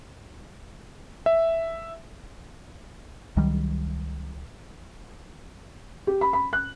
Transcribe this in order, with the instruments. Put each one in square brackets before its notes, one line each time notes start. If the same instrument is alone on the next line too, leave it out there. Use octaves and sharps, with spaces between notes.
[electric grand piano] E5
[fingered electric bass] C#2 D#3 F#3 G3
[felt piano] G4
B5
B5
F#6